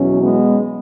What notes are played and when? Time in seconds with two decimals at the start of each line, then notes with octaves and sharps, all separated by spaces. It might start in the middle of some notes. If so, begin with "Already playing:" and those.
Already playing: E2 B2 F#3 C#4
0.23 G#3 B3